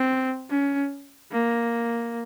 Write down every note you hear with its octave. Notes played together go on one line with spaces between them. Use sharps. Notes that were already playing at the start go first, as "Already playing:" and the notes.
Already playing: C4
C#4
A#3